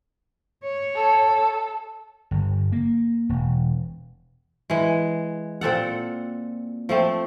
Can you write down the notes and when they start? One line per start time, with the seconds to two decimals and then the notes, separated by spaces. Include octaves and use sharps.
0.64 C#5
0.96 A4
2.31 G1
2.72 A#3
3.29 E1
4.70 E3 G#3
5.61 A#2 C4 A4 F#5
6.89 F3 A3 C4